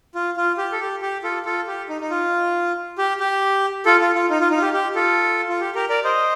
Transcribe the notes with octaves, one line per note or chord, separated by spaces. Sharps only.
F4
F4
G4
A4
G4
G4
F4 A4
F4 A4
G4
D#4
D#4
F4
G4
G4
F4 A4
F4
F4
D#4
F4
D#4
F4
G4
G4
F4 A4
F4
G4
G4 A#4
A#4 D5
C5 D#5